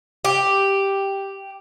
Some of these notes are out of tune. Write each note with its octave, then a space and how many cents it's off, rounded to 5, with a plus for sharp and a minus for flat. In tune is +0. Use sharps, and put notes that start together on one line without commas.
G4 +0